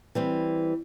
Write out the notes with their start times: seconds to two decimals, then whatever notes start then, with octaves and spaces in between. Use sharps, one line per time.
0.15 E3 G3 C4